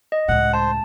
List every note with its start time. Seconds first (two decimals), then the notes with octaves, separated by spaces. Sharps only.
0.12 D#5
0.28 C#2 A2 F#5
0.53 C5 A5